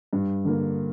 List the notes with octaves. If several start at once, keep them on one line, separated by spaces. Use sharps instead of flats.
G2
D3 A#3